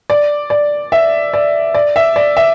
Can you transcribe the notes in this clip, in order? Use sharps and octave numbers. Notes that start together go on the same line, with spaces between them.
D5
D5
E5
D5
D5
E5
D5
E5